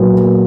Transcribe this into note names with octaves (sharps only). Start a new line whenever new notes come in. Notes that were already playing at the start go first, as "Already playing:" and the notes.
Already playing: A#2 F#3 B3